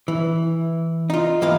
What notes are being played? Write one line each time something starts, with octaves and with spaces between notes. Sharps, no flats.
E3
D#4 F4
G2 E3 A#3 D#5 F5